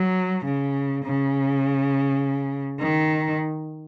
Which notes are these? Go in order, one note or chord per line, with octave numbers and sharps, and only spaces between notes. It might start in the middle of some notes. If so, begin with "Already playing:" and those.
Already playing: F#3
C#3
C#3
D#3